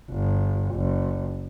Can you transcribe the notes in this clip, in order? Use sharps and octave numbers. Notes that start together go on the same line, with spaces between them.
G1
F#1